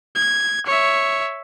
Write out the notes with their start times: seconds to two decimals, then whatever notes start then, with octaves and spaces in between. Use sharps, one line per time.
0.15 G#6
0.67 C#5 E5